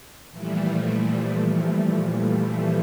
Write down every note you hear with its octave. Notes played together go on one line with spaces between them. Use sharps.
A#2 E3 F3 G3 A3